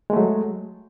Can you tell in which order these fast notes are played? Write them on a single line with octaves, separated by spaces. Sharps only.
G#3 A3 F#3